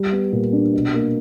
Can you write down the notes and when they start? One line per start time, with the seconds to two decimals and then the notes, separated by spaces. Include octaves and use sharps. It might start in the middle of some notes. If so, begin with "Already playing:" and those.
Already playing: G3
0.12 B3
0.32 A#2
0.53 D4
0.73 B2
0.94 A#3